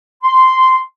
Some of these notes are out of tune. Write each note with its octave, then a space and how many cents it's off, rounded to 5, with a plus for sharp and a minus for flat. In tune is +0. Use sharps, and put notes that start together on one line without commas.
C6 -10